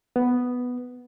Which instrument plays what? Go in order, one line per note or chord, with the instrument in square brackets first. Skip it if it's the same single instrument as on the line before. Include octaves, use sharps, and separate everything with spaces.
[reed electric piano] B3